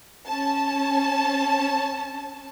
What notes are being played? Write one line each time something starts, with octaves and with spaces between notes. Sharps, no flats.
C#4 A5